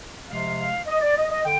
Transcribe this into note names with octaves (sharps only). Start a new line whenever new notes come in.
C3 F3 G#3 F5
D#5
D5
D#5
D#5
D3 G5